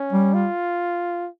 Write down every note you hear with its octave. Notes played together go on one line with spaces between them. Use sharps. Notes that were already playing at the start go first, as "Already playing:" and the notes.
Already playing: C#4
G3
F4